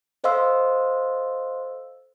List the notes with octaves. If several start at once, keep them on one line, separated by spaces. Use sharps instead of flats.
A4 C5 D#5 F5 C6 E6